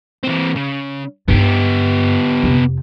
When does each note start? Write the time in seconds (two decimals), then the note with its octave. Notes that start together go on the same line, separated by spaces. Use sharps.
0.23 E3 C4
0.56 C#3
1.28 G2 B3 D#4 G4
2.43 F2 C3